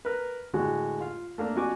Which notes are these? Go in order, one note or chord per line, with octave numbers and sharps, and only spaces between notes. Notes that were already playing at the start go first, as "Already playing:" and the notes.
A#4 B4
A2 D3 G#3 F#4
F4 F5
A3 A#3 D4
F2 D4 F#4 G#5 D6